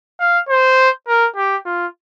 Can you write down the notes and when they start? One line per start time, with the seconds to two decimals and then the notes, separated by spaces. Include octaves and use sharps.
0.20 F5
0.49 C5
1.07 A#4
1.36 G4
1.65 F4